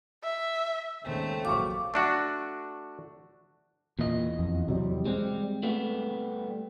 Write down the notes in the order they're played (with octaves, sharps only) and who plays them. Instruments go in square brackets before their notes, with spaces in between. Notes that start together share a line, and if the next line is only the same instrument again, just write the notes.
[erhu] E5
[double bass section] D#2 C#3 G#3 [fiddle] A3 C4
[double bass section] A#1 F#3 [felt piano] F5 C#6 [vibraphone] D6
[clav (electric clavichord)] A3 D4 F#4
[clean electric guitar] E2 D#5 [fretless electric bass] A#2
[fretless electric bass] F2
C3 F#3 G3
[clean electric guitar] G3 [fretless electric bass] G#3 C4
[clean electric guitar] G3 A3 B3